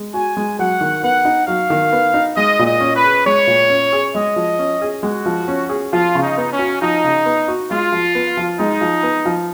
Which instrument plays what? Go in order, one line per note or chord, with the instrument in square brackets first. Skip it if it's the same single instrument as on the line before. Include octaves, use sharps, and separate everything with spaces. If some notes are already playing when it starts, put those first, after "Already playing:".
Already playing: [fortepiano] G#3
[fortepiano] F#4 [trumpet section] G#5
[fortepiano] G#3
[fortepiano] F#3 [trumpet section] F#5
[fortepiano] D#3
[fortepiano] B3 [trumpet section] F#5
[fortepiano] D#4
[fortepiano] F#3 [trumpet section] F5
[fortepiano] D#3
B3
D#4
[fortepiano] G#3 [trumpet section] D#5
[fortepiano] A#2
[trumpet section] D#5
[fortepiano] C#4
[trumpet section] B4
[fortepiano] G#4
[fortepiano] G#3 [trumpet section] C#5
[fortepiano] A#2
C#4
G#4
[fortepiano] G#3 [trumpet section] D#5
[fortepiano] F3
C#4
G#4
[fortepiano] G#3 [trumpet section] F#4
[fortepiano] F3
C#4
G#4
[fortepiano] F3 [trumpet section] F4
[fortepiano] C#3
[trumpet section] D#4
[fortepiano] B3
[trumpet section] C#4
[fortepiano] F#4
[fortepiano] F3 [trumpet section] D#4
[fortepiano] C#3
B3
F#4
[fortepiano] G#3 [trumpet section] F4
[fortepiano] F3
B3
F3
[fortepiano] G#3 [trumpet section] D#4
[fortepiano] F3
B3
F3